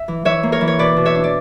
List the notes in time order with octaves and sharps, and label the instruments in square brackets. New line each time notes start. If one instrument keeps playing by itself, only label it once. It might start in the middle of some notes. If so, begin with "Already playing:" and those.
Already playing: [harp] E5
E3
E3 C#5 E5
A#3
A#4 C#5
E3
C#5
B2 B4 D5
B2
C#5 E5
D4
D5